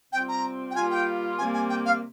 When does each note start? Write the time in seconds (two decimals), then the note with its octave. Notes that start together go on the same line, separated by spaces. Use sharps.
0.13 C3 G3 C4 F4 G5
0.29 A#5
0.71 G5
0.75 G3 A#3 F4 G#5
0.91 G5
1.38 C3 G3 A#3 G#5
1.54 G#5
1.70 G5
1.86 F5